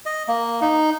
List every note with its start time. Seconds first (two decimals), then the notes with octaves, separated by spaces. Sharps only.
0.06 D#5
0.28 A#3
0.61 D#4